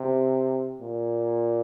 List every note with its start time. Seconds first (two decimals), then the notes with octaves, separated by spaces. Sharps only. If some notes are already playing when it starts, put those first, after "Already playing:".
Already playing: C3
0.81 A#2